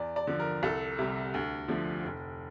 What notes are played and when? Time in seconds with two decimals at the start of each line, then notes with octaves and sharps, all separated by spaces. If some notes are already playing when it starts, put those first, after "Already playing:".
Already playing: E2 D5
0.16 D5
0.27 D3 F3
0.40 A#4
0.63 C2 A4
0.99 C3 G3
1.34 D2
1.68 D3 F3 A3
2.04 F1